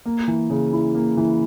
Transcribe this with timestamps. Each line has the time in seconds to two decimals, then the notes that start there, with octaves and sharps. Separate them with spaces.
0.06 A#3
0.28 E3
0.50 C#3
0.73 E4
0.95 A#3
1.17 E3